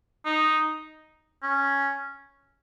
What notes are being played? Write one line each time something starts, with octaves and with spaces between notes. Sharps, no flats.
D#4
C#4